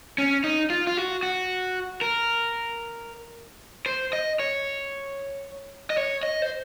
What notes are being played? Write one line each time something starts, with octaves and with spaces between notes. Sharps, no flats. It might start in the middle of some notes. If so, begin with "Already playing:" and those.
C#4
D#4
F4
F4
F#4
F#4
A#4
C5
D#5
C#5
D#5
C#5
D#5
C5